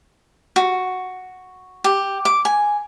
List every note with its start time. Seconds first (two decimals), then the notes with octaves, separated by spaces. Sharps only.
0.56 F#4
1.84 G4
2.25 D6
2.45 G#5